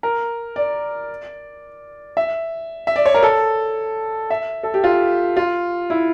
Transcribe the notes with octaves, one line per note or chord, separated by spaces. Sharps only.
A#4
D5
E5
E5
D5
C#5
A#4
A4
E5
A4
G4
F4
F4
E4